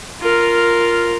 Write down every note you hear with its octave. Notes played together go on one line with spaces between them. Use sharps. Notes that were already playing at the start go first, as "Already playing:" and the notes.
F4 A#4